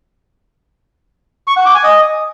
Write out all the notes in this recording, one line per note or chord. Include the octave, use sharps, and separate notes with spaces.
C#6
F#5
D6
G#5
D#5